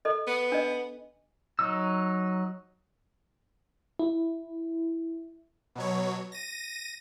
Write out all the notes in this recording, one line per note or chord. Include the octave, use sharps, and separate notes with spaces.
A4 D#5
B3
D4 D#5
F#3 D#4 E6
E4
B2 F#3 C#5
A#6 D#7